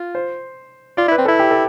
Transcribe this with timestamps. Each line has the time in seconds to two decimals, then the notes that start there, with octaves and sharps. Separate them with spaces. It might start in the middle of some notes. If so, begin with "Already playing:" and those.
Already playing: F4
0.15 C5
0.97 F4 D5
1.08 E4
1.12 B4
1.18 C4
1.25 E4 A4
1.39 G4
1.50 A4